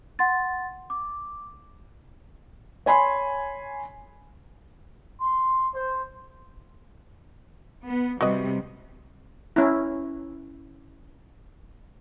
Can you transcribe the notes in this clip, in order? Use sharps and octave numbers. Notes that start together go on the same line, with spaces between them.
F#5 C6 A6
D6
C#5 G#5 B5 C6
C6
C5
B3
C3 G3 F#4 B4 D#5
C#4 E4